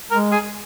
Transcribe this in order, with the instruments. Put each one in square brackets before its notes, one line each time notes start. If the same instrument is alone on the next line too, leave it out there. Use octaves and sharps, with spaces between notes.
[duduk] G#3 [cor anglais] A#4
[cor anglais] G#4